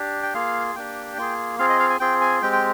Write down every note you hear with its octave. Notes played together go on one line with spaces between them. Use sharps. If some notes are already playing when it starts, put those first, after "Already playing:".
Already playing: D4 G4
G5
A#3 F4 G#4 F5
A#3 D4 G4 G5
A#3 F4 G#4
C4 F4 G#4 F5
D#5
F5
G#5
C4 F4 G#4 G5
G#5
G#3 C4 G4 G5
G5